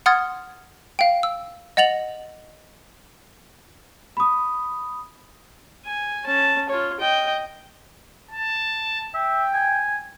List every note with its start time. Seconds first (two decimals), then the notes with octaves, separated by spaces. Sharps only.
0.06 F#5 C6 D#6 F6 G#6 A6
0.99 F5 G5
1.23 E6
1.77 D#5 F#5 A6 F7 F#7
4.17 B5 D#6
5.86 G#5
6.25 C#4 A5
6.69 F4 C#5
7.00 D#5 G5
8.31 A5
9.14 E5 G5
9.53 G#5